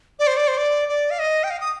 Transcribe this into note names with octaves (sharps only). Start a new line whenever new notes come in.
D5
C5
D5
C5
D5
D5
F5
D#5
G5
F5
D#6